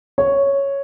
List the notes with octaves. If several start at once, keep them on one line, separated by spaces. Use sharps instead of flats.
C#5